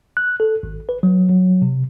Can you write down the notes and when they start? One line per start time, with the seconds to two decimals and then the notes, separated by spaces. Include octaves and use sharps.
0.17 F#6
0.40 A4
0.63 G#1
0.89 B4
1.03 F#3
1.29 F#3
1.62 C3